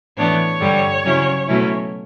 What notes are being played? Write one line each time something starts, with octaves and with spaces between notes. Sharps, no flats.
A2 E3 B3 D4 C#5
G2 D3 G3
C#3 F#3 C#4 E4
B2 F#3 A3 C#4 E4